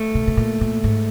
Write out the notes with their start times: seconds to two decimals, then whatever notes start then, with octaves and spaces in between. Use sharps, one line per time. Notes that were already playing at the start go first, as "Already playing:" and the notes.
Already playing: A3
0.15 B2
0.27 B2
0.37 A#2
0.61 A#2
0.84 G#2